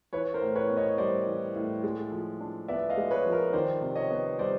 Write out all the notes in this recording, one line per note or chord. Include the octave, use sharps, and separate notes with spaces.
E3 B4 C#5
A#4 C5
A2
B4 C#5
B3
C#5 D#5
G3 C5 D5
E3
A2
G#3
F3
D4
B3 D5 E5
D#5 F5
G#3
B4 C#5
F3
A#4
D#3 C5 D5
C3
C#5 D#5
B3
G3 C5 D5